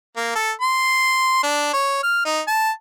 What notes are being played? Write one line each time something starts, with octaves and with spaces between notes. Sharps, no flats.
A#3
A4
C6
D4
C#5
F6
D#4
A5